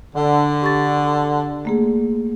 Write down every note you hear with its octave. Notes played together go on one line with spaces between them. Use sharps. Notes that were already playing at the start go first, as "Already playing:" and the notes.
D3
G4 C#6 A6
A3 A#3 G#4